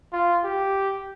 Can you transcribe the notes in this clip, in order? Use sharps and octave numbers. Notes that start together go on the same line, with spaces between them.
F4
G4